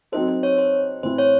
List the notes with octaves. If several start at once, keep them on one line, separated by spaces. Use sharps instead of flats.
F#3 C4 D#4 A4 C5
C5
C#5
C5
A2 E3 C4 E4 C5
C#5